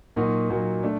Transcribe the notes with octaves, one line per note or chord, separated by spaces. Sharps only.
A#2 F#3 A#3 D#4 F#4
A#2 F#3 A#3 D#4 F#4
A3 D4